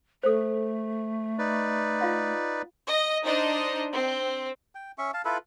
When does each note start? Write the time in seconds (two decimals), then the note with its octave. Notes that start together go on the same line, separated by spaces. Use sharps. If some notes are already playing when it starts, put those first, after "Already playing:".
0.23 A3 A4 C5
1.39 D#4 B4 D5
2.01 F4 F5 F#5
2.88 D#5
3.24 D4 D#4 C5 D#5
3.93 C4
4.75 G5
4.98 C#4 E5 C#6
5.14 F5 A5
5.25 E4 F4 A4 B4